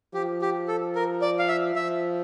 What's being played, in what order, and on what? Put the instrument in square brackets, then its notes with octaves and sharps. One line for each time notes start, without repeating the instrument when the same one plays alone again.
[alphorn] F3 [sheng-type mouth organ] G4
[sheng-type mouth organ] G4
A4
A#4
D5
F5
E5
[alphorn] F3 [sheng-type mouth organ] E5